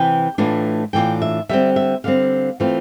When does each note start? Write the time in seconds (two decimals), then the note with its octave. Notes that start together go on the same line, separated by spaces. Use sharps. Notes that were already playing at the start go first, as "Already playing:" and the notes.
Already playing: C3 E3 B3 G5
0.38 A2 E3 A3 D4 F4
0.93 A2 E3 A3 D4 F4 G5
1.22 E5
1.49 D3 G3 C4 E5
1.76 E5
2.04 D3 G3 C4 F5
2.60 E3 A3 C4 F4